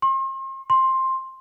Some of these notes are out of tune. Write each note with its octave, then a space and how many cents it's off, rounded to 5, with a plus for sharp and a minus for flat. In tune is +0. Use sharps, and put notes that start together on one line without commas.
C6 +40
C6 +10